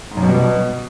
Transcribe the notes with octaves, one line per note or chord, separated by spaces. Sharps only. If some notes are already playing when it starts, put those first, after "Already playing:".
G#2
F#2
B2
G3
B2